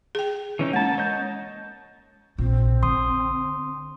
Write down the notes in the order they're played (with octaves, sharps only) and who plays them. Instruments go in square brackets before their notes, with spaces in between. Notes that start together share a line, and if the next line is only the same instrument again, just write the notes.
[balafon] G#4 G5
[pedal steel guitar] E3 C#4 D#4
[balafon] G#3 C#4 [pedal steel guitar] A#3 A5
[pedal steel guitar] C#5 D#5 G6
[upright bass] A#1 A#2 [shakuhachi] C4
[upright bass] D3 [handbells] C6 D#6